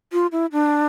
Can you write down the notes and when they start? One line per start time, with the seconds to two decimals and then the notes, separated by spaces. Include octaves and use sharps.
0.13 F4
0.32 E4
0.52 D4